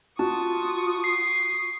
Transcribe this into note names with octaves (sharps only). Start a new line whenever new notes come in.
F4 F#4 A5 C#6 D#6
C7